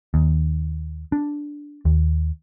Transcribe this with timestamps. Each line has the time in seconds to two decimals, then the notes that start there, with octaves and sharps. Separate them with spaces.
0.14 D#2
1.12 D4
1.85 D#2